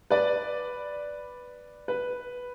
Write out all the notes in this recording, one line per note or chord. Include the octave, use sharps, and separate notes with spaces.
B4 D5
B4